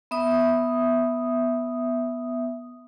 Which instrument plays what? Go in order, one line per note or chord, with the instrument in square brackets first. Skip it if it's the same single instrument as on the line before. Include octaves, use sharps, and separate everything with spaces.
[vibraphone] B3 E5 D#6